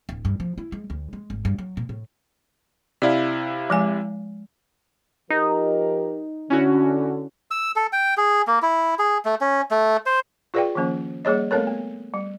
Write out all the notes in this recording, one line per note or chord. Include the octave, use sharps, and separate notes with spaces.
D1
G2
F3
E4
G#3
D2
G#3
G#1
G2
F#3
A#2
A2
C3 E4 D5 F5
F3 G#3 G#5
F3 D#4 G4 A#4
D3 C#4 E4 F#4
E6
A4
G5
G#4
A#3
E4
G#4
A3
C#4
A3
C5
F4 G#4 B4 D5 F5 G5
D#3 F3 A#3 C#4
G3 A#3 G#4 C#5 D#5
A3 B3 C4 A4 A#4 C#5
B3
G3